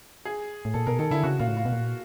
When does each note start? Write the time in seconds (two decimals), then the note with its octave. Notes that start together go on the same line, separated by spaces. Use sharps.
0.25 G#4
0.65 A2
0.74 A#2 A4
0.87 B2 A#4
0.99 D#3 A4
1.11 D3 E4
1.23 C#3 F#4
1.39 A#2 F4
1.48 A2
1.57 F4
1.65 B2
1.72 A#2